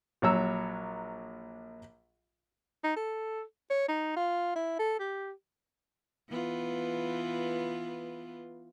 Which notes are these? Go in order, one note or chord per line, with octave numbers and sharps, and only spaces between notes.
A#1 F#3 C#5 A#5 E6
D#4
A4
C#5
D#4
F4
E4
A4
G4
E3 B3 F4